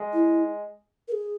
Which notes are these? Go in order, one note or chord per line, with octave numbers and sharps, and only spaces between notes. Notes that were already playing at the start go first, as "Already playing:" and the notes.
Already playing: G#3
E4
A#4
G#4